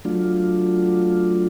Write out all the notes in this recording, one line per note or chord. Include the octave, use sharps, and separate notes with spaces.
F#3 A3 D4 F4